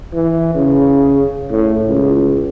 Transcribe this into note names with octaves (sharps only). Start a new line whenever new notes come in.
E3
C#3
A2
C#2